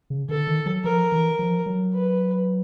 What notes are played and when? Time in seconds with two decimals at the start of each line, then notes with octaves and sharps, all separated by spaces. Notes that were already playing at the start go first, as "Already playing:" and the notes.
0.10 C#3
0.29 D3 A4
0.47 D#3
0.66 F#3
0.84 F3 A#4
1.12 E3
1.39 F3
1.66 F#3
1.94 B4